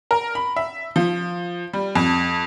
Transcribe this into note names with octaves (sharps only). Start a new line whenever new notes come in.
A#4
B5
E5
F3
G3
F2